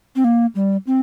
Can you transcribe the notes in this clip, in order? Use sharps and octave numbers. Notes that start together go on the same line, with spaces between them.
C4
A#3
G3
C4